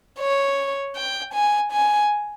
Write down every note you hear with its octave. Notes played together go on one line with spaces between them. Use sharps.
C#5
G5
G#5
G#5